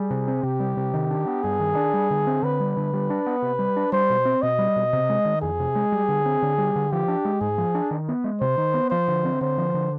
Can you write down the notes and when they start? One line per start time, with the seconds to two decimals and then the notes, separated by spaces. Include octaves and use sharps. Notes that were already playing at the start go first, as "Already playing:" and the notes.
Already playing: G3 G#4
0.10 C3
0.28 C4
0.43 C3 G4
0.60 G3
0.77 C3
0.94 D#3
1.11 D4
1.27 B3
1.43 G2 G#4
1.59 D#3
1.76 D4
1.94 G3
2.11 D3
2.27 C4
2.43 D3 B4
2.60 G3
2.77 D3
2.93 G3
3.10 D4
3.26 B3
3.42 C3
3.59 G3
3.77 D4
3.92 G3 C5
4.10 B2
4.25 C4
4.42 B2 D#5
4.59 G3
4.76 B2
4.93 C3
5.10 G#3
5.25 D#3
5.42 F2 G#4
5.59 C3
5.75 G#3
5.92 G3
6.09 D3
6.26 C4
6.42 D3
6.58 G3
6.76 D3
6.92 F3 G4
7.08 D4
7.25 G#3
7.41 G#2 G#4
7.58 F3
7.75 D4
7.91 D#3
8.09 B3
8.24 G#3
8.41 C3 C5
8.58 D#3
8.74 B3
8.91 F3 C5
9.08 D3
9.25 C4
9.41 D3 C5
9.58 F3
9.74 D3